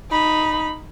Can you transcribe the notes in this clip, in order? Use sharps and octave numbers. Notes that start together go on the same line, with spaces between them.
D#4 B5